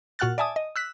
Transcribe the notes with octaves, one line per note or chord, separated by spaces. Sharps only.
A#2 F#4 F#5 F6 F#6 A6
D5 E5 G#5 A5 D#6
D#5
E6 F#6 B6